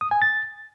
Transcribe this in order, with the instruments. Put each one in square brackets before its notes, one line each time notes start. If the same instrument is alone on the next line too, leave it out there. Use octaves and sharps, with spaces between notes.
[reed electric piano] D#6
G#5
A6